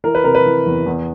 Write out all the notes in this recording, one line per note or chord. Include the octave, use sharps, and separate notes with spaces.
E3 A#4
B4
C3 A#4
B4
E3
E2
E2